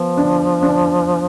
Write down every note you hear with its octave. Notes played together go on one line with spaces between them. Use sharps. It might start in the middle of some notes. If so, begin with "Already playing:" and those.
Already playing: F3 B3
D4
D4